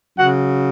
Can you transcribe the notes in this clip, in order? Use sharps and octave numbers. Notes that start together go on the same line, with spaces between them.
C#3 F#3 F#4 F#5